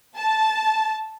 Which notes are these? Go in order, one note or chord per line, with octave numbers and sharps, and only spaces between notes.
A5